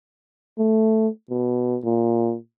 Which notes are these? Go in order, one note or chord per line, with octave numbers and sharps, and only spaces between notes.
A3
B2
A#2